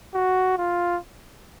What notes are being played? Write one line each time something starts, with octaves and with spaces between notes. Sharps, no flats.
F#4
F4